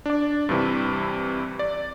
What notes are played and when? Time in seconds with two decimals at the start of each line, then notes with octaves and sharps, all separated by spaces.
0.06 D4 D5
0.49 G2 C3 E3
1.59 D5